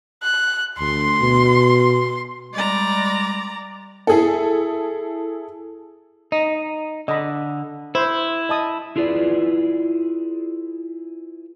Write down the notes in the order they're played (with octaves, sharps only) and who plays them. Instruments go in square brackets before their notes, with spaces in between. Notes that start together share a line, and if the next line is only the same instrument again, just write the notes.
[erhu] F#6
[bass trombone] D2 [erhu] C6
[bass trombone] B2
[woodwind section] G3 G#3 [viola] D5 A#5
[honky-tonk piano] E4 G#4 A4
[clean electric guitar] D#4 [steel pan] D#5
[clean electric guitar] D3 [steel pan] D#5 B5
[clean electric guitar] E4 [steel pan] C5
[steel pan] D#5 A5 D#6
[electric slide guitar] E4 F4 G#4 B4 D5